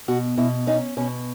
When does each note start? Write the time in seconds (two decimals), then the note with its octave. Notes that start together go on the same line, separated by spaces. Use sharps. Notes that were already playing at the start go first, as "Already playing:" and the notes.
0.08 B2 F#4
0.37 B2 E4
0.67 C#4 D#4
0.97 B2 C#4